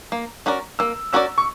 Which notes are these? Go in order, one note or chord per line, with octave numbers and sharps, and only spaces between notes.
A#3
C#4 F#4 A#4 D5
A#3 E6
C#4 F#4 A#4 D5 E6
C#6